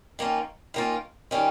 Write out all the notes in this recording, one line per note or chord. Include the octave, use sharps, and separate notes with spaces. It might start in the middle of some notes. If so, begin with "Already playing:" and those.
D#3 A#3 C#4 F4
D#3 A#3 C#4 F4
D#3 G3 C#4 F4